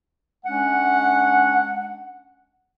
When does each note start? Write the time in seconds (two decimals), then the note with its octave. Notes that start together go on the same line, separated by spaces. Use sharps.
0.46 G#3 C#4 D4 F#5